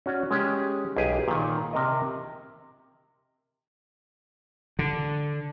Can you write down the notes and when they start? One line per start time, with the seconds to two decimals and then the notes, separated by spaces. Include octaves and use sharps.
0.06 C#4 F#4 D5
0.31 G#3 C#4 G4
0.96 B1 G4 G#4 G#5
1.28 A#2 D#3
1.73 C3 A#4 D#5
4.79 D3